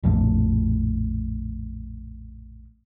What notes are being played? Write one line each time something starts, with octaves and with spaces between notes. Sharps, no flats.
A#1 F2 A2